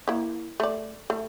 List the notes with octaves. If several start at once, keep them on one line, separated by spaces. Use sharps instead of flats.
A#3 E4
A3 D5
A3